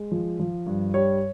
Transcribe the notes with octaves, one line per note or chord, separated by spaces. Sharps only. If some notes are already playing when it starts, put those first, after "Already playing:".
Already playing: G#3
F3
F3
G2
G3 C#5